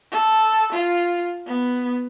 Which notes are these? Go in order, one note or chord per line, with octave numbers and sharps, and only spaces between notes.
A4
F4
B3